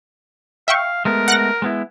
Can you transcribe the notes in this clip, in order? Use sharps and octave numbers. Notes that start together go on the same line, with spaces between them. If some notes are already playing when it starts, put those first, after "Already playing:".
E5 F5 G5 C#6
G#3 A3 B3 A#4
F#5 F#6 A#6
G#3 B3 E4